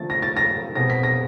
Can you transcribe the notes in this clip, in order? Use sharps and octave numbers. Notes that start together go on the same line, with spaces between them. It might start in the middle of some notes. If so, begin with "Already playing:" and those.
Already playing: D3 F3 A3 A6
A#6
A6
A#6
B2 G#3 C4 A#6
B6
A#6